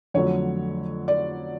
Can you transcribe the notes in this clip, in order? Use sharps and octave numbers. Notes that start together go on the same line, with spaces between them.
F2 D3 F#3 A3 C#5
D5